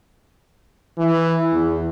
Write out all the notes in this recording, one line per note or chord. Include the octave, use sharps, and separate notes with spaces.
E3
E2